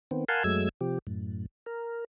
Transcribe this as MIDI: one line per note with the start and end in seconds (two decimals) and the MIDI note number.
0.11 0.25 51
0.11 0.25 59
0.11 0.25 60
0.28 0.43 70
0.28 0.43 77
0.28 0.43 78
0.28 0.43 80
0.28 0.43 81
0.28 0.43 84
0.44 0.69 42
0.44 0.69 54
0.44 0.69 56
0.44 0.69 57
0.44 0.69 88
0.44 0.69 92
0.81 0.99 48
0.81 0.99 53
0.81 0.99 67
1.07 1.46 42
1.07 1.46 45
1.66 2.04 70